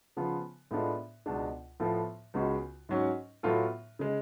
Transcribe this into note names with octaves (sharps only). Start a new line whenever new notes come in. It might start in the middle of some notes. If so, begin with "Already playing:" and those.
C#3 F3 B3 F4
A2 G#3 B3 D4 F4
C#2 B2 G#3 D4
A2 F3 B3 F4 A4
C#2 C#3 G#3 B3 F#4
G#2 F#3 C#4
A2 F#3 B3 F4 A4
C#3 G#3